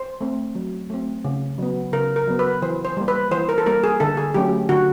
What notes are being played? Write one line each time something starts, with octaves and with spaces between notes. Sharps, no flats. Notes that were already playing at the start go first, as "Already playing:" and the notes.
Already playing: C5
A3 C4
F#3
A3 C4
C#3
F#3 B3
C#3 A#4
A#4
F#3 B3
B4
E3 C5
C5
G3 A#3
B4
E3 C5
A#4
A4
G3 A#3 A#4
G#4
D3 A4
G#4
F#3 A3 C#4 G4
D3 F#4